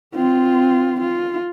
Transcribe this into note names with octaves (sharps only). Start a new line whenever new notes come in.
C4 F4
F4